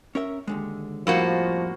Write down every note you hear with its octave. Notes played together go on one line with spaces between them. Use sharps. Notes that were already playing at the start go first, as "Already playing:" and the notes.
C#4 A#4 E5
D#2 D3 G#3
F2 A2 F3 G3 A#3 F#4